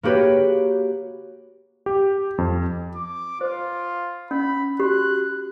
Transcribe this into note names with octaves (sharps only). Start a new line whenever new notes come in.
A#3 F#4 G4 B4 C#5
G4
F2
D6
F4 C5
C#4 B5
F#4 G4 F#6